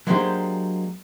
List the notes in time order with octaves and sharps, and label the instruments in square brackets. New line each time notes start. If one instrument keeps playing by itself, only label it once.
[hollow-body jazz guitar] F#3 G#3 A#3 D4 G4 C5